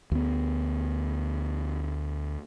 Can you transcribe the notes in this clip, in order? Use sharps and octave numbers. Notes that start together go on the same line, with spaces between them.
D2 B3